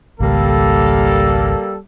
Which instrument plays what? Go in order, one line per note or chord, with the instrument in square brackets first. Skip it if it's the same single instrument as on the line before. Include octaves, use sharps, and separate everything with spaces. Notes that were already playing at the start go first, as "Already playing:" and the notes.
[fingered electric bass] G#1 C#2 [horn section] G3 A#3 A4